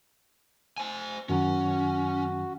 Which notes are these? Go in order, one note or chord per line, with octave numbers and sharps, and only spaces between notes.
C5 G#5
F#2 D#3 F#3 C#4 F#4